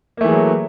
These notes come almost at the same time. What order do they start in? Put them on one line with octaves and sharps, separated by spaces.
A#3 A3 E3 G#4 F#3